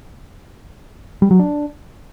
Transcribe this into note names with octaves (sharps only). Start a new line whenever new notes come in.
G3
F#3
D4